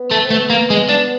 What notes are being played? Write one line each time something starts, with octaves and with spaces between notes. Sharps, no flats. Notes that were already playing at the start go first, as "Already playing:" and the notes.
Already playing: B3
A3
C4
A3 B3
A#3
G#3
D4